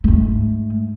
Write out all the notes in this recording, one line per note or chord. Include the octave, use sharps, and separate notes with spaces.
G#2 A3